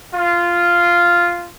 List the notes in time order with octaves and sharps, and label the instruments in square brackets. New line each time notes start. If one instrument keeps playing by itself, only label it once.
[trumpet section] F4